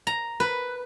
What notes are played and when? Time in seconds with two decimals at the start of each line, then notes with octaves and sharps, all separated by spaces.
0.07 A#5
0.40 B4